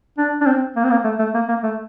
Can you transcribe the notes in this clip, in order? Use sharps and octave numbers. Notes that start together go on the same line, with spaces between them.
D4
D4
C4
A#3
C4
A#3
A3
A3
A#3
A#3
A3